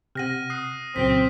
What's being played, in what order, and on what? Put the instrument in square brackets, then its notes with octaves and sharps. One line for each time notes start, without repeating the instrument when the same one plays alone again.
[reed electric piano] C3 [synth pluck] G4 F#5 [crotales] F6 A#6 D#7
[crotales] D#6 C7 [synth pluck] F#6
[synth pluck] C2 A#2 [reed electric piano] C#3 F#3 [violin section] C4 [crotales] B6